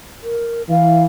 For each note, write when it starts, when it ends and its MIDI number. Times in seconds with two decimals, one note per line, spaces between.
0.23 0.62 70
0.69 1.06 52
0.69 1.03 77